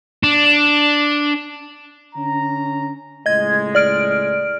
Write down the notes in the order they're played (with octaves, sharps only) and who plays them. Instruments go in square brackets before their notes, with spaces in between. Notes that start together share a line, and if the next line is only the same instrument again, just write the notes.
[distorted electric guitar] D4
[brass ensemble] D3 C#4 A#5
[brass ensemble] C#2 A2 G#3 [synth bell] D#5 G#6
[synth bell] D5 F6 D7